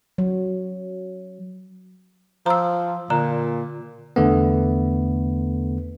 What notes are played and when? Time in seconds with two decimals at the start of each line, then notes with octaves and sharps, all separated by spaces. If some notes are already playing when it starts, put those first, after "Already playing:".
0.18 F#3
2.46 F3 A#5 E6
3.10 A#2 D3 A#5
4.16 E2 D3 A3 B3